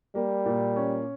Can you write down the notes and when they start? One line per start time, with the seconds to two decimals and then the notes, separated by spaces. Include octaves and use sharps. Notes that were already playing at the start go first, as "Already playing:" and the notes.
0.15 G3 A#3
0.46 A#2
0.76 C#4